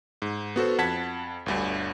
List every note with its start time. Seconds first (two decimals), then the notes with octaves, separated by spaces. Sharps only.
0.22 G#2
0.56 B3 F#4 A4 C5
0.78 F2 F#5 A5 G#6 B6
1.46 G1 D2 G2